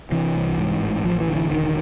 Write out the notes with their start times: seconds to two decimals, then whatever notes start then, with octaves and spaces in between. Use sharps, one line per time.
0.12 C3 E3
0.35 C2
0.58 G#2
0.81 A1
1.04 A1 F3
1.20 E3
1.28 D3
1.36 E3
1.51 E1 D#3